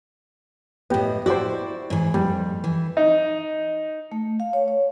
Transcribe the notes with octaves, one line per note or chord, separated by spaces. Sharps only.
A2 B3 G4 D#5
E4 F#4 G4 C5 D5
G#2 E3
F2 G3
E3
D#4
A3
F5
C#5
C#5